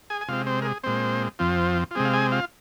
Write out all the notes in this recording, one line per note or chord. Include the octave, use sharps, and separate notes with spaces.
G#4 G#5
G#5
C3 G#3 C4 F4 F5
C4 C5
A#4
G#4
A#2 G#3 C4 C5
F2 F3 C4 F4
F4
C3 G#3 C4 G#4
F5
G#4 G#5
F4 F5